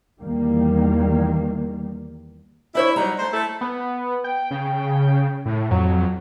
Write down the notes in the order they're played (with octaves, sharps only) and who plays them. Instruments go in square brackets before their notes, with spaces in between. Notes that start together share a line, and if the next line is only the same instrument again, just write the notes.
[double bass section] E2 D#3 G3 A#3
[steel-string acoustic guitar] D4 C5 C#5 [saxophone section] E4
[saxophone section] F#3 G3 D#4 [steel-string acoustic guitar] A#5
[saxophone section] A3 C5
A3 E4 A4
[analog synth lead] B3
G5
[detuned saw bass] C#3
A2
[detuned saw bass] F2 [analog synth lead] F#3